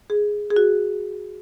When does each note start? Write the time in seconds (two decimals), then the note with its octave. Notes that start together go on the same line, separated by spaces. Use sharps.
0.10 G#4
0.51 G#4
0.56 F#4